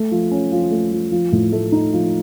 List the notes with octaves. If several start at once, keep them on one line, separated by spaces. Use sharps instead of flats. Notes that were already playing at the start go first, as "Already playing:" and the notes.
Already playing: A3
F3
C#4
F3
A3
F3
F3
A2
A3
D#4
F3